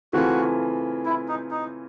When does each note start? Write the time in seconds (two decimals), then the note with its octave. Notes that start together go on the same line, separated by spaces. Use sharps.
0.13 C#3 E3 A3 C4 F4 F#4
1.05 E4
1.28 D#4
1.51 D#4